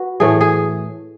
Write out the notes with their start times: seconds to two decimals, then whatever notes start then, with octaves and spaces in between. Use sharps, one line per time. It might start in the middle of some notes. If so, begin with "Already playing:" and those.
Already playing: F#4 B4
0.20 A2 E3 A3 G#4
0.41 G#4